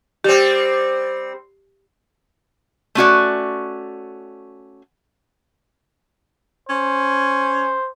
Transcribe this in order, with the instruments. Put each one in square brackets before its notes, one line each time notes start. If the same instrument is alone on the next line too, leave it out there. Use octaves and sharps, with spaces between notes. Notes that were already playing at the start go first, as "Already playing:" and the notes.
[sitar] G3 C4 [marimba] G4
[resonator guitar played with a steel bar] A3 C#4 F#4 D5
[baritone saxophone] C#4 [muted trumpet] C5